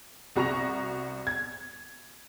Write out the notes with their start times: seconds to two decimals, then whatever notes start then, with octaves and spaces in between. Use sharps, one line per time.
0.36 C2 F#4 A#5 C#6 A#6 F7
1.27 G#6